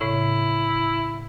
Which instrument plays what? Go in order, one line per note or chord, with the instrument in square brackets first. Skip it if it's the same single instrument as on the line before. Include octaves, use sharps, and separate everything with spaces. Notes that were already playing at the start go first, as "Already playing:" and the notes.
[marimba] A2 C#3 [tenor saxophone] E4